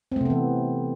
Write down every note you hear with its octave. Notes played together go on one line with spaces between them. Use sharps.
C3 E3 A3 B3 C4